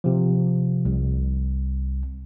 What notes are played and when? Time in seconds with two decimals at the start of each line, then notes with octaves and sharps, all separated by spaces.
0.04 C3 F3
0.85 C2